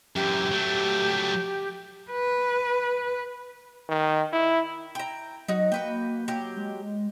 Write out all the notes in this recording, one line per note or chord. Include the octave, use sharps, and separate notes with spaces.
F#2 E3 G4
F#3 A3
B4
D#3
E4
G5 A#5
F#3 D#4 F#4
A#3 F#4 B4 G5
F#3 G4
G#3